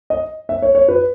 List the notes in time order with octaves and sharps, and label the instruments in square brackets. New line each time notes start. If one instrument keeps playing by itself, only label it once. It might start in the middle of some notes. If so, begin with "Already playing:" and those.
[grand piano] D#5
E5
C#5
C#5
B4